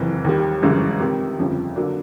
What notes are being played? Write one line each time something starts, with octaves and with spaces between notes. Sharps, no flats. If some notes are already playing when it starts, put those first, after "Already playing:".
Already playing: F#1 F2 C3 E3
D#2 D#3 G3
G1 F#2 C#3 E3 G#3
C3 D#3 G3
G1 F2 C#3 F3
D3 F#3 A#3 D4